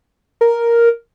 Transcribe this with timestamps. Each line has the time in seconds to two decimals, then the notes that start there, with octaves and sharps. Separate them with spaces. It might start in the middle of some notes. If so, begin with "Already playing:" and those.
0.41 A#4